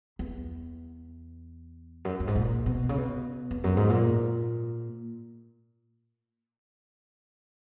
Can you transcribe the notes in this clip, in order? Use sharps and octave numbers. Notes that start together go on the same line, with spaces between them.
E2
F#2
F#2
G#2
A#2
B2
C#3
B2
E2
F#2
G#2
A#2